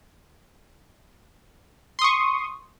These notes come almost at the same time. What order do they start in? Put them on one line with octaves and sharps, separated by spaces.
C6 D#6 C#6